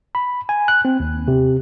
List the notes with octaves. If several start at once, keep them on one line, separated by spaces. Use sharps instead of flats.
B5
G#5
F#6
C4
D#2
C3